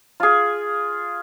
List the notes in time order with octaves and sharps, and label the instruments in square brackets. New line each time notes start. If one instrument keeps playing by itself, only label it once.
[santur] F4 G#4